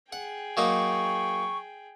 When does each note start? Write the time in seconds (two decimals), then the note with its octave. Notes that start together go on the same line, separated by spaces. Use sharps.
0.13 G#4 F#5 G5
0.57 F#3 A#3 D#4 C#6